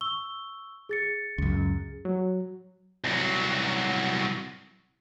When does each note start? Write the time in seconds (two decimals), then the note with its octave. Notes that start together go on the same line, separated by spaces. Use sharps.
0.01 C#6 E6 G7
0.89 G#4 A6 C#7
1.38 C#2 F#2
2.05 F#3
3.04 C2 F#3